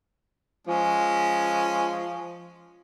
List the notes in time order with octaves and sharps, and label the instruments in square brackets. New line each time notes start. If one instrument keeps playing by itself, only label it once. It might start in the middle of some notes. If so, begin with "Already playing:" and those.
[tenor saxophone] F3 [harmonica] G#3 C#4